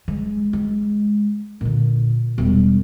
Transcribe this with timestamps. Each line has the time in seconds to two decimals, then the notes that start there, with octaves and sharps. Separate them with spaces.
0.08 G#3
0.53 G#3
1.61 A#2 D3
2.38 E1 G3